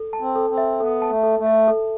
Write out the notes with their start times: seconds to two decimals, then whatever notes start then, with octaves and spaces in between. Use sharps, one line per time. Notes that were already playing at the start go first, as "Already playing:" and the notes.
Already playing: A4
0.13 A5
0.20 C4
0.36 A4
0.50 C4
0.57 E5
0.80 B3 A4
1.02 A5
1.09 A3
1.23 A4
1.39 A3
1.46 E5
1.68 A4